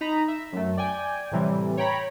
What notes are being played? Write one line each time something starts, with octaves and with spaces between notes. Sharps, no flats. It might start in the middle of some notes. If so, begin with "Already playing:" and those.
D#4 A#5 B5
E5
F#2 A3
D5 G5 G#5
A2 C3 E3 G3
C#5 G5 A#5 B5